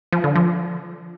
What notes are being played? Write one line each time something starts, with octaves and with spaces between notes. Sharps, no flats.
F3
D3
F3